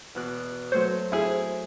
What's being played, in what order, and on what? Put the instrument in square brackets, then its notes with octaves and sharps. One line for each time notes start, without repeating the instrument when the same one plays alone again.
[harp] E2 B2 F#6
[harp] F#3 A3 C#5 [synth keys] C5
[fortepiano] E4 G#4